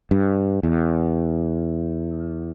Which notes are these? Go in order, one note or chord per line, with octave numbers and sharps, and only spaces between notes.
G2
E2